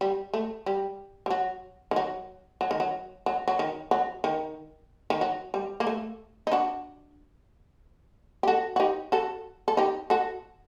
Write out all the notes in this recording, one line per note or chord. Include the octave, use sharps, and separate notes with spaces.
G3
A3
G3
G3
F#3
D#3
F#3
F#3
D#3
F#3
F#3
F#3
D#3
F#3
D#3
D#3
F#3
G3
A#3
A3
D#4
D4 F#4
G4
F#4 A4
F#4
D#4 G4
F#4 A4
A4
D#4 G4
F#4 A4